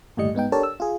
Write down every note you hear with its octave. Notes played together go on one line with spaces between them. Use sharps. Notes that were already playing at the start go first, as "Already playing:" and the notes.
G1 D#2 A2 G3 D#5 C#7
G#2 B3 D#4 G5
D4 G4 A4 A#4 C#5 A5
E6
F4 G#4